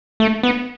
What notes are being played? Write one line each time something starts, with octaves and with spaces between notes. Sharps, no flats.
A3
B3